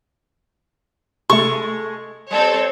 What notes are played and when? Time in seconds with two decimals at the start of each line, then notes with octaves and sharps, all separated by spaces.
1.30 C3 G#3 A3 G#4 A4 C#6
2.31 G3 C4 A4 C#5